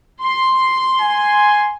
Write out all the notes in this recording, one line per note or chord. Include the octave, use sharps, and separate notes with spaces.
C6
G#5